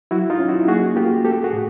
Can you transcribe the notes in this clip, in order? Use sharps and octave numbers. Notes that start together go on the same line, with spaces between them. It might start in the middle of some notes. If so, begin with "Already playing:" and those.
F#3 E4 F#4
D#4 F4
C#4
E4 F#4
A#3 F#4 G#4
A#3 F4 G4
A3 G4 A4
F#4 G#4
A2